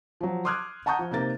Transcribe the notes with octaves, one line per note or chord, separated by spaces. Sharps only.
F3 F#3
C6 D6 D#6 F6 F#6 G#6
F#5 A5 A#5 C#6 D#6 G6
F3
C3 A#3 D#4 A#4 A6